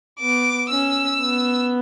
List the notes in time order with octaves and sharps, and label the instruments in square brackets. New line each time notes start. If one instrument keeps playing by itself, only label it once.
[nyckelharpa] B3 [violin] D6
[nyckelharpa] C#4 [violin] E6
[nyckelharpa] B3